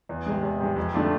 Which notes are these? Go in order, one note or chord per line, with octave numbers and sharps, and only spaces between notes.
E2
C3 G#3
E2
C3 G#3
F2
D3 A3 D4 F4